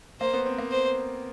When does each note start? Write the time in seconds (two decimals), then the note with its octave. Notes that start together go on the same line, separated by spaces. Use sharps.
0.20 A#3 C5
0.33 B3
0.46 C4
0.58 A#3
0.72 C5